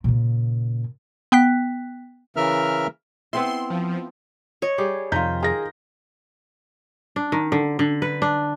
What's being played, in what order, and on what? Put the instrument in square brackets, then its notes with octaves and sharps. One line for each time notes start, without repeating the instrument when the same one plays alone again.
[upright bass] A#2 C#3
[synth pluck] B3 G5 F#6 B6
[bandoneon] C#3 E3 A#4 E5 F6
[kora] B3 C4 E4 [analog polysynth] C6
[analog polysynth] F3
[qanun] C#5 [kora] D#5
[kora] G3 G4 G#4
[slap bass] F2 C3 F3 [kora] D#3 F4 [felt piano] A#5 G6 B6
[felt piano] G#4 A#6 [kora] A#4
[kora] D4
D#3
D3
D3
B4
D4